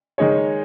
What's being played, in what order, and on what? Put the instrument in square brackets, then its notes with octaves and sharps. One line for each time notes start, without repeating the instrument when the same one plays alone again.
[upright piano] D#3 G#3 D#4 G#4 C#5